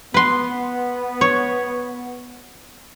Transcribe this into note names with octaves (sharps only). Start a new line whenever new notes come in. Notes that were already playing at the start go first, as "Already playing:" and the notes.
B3 B4 C6
C#5